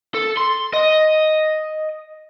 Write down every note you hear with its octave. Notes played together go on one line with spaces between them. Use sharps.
A4
C6
D#5